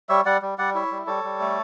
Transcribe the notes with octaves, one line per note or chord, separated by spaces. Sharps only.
G3 C#5 E5
G3 D5 F#5
G3
G3 D5 F#5
E4 C#5 E5
G3
G3 A4 C#5
G3
A3